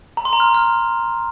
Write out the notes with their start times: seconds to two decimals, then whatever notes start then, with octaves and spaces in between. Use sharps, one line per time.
0.17 A#5
0.25 C6
0.33 A#5
0.40 F6
0.55 F6